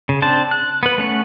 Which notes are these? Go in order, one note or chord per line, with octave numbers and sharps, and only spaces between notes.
C#3
C4 D4 C5 A5
F#6
B3 B4
A3 C#4 F#5